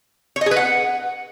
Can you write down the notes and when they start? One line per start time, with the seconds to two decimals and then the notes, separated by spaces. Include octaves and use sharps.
0.36 C#5
0.41 D#5
0.46 G#4
0.51 B4
0.56 F#5